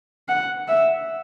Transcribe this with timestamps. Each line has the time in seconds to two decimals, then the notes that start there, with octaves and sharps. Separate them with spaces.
0.29 F#5
0.68 E5